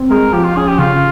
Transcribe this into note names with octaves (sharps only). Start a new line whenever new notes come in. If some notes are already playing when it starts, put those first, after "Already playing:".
Already playing: C4
G#3 A#4
F3 G4
F4
C#4 G#4
G4
C#3 F4